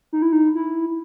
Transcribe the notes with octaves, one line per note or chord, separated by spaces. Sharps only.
D#4
E4
D#4
E4